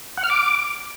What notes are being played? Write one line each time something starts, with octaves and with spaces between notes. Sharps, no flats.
F#5
F6
D6